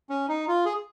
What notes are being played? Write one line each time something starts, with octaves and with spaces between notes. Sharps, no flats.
C#4
D#4
F4
G#4